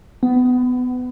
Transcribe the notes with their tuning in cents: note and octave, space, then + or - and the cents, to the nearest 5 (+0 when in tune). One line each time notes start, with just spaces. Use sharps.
B3 +20